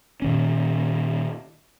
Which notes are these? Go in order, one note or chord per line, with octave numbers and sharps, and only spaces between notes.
A#2 D#3 C#4